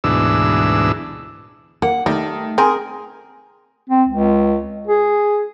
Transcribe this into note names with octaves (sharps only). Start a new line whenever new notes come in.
D2 G#2 B2 E3 D4 E6
A#3 F#5
D#3 G3 A3
C4 G#4 A#4
C4
C#2
G#4